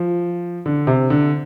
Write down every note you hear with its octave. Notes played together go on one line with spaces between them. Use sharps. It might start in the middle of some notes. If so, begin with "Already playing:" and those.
Already playing: F3
D3
C3
D3